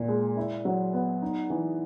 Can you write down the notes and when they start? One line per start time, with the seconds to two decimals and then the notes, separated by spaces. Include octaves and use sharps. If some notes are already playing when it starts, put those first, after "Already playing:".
Already playing: A#2
0.08 G#3
0.37 E4
0.65 F#3
0.93 B3
1.22 D#4
1.50 E3